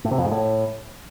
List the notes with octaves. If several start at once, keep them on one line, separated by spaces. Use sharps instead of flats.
A2
C3
F2
G#2
A2